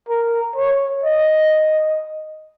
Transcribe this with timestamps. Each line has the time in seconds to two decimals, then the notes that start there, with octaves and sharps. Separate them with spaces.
0.09 A#4
0.56 C#5
1.04 D#5